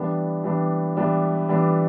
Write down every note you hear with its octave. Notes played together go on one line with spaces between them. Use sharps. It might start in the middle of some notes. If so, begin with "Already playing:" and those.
Already playing: E3 G3 B3 D4
E3 G3 B3 D4
E3 G3 B3 D4
E3 G3 B3 D4